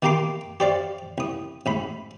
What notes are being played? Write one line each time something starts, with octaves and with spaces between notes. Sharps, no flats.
D#3 A#3 G4 A#5 C6 D6
G4 C5 D5 F5
C2 D#6
A1 G#2 B5